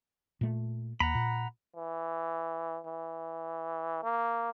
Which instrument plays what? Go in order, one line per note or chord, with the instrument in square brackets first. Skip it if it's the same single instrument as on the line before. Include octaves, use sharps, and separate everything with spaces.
[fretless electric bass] A#2 A3
[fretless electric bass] D#2 [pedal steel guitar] F#5 A#5 B5
[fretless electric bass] A#2
[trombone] E3
E3
A#3